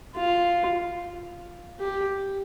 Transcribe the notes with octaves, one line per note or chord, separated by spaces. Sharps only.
F4
G4